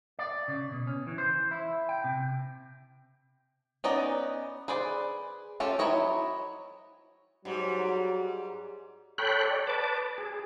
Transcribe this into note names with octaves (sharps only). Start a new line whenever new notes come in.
D5
C#3
B2
C#4
E3
C5
E4
G5
C3
B3 C#4 D#4 D5 D#5
G#4 B4 C5 D5
C#4 F4 G4 A4
F#3 E4 C5 C#5 D#5
G#2 F#3 G3
A4 C#5 G5 B5 F#6
C#5 D5
B4 A5 D6
G#4